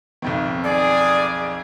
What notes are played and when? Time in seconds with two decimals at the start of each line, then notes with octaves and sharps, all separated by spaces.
0.22 B1 F2 D#3
0.64 G#4 D5